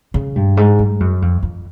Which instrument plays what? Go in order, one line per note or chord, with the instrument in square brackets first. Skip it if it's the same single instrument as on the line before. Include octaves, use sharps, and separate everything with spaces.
[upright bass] C#3
G2
G#2
G2
F#2
F2
F2